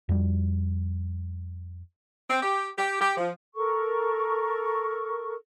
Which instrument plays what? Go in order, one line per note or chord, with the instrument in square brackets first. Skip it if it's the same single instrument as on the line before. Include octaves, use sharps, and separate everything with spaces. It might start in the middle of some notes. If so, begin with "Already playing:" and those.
[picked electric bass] F2 G3
[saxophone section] C4
G4
G4
G4
F3
[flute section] A4 A#4 C#6